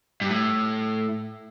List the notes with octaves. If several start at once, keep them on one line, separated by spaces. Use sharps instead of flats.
G2
A2